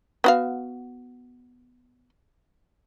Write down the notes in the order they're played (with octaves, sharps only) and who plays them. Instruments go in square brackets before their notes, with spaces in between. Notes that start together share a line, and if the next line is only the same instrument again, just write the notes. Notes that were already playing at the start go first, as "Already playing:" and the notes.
[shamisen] B3 F#4 F5